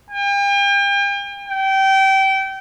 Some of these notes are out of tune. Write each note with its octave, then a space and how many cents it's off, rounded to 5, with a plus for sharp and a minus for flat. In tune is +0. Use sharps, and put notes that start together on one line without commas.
G5 +40
G5 -25